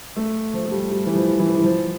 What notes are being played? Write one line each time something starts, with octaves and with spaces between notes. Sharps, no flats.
A3
F3
A3
G3
G3
E3
F3
E3
E3
F3